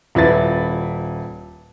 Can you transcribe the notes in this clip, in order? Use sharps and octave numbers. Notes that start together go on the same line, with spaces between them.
D#1 E4 B4 A6